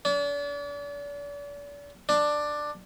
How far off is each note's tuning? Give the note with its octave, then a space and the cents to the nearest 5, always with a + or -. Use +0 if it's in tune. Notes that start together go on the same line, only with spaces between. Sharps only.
D4 -40
D4 +10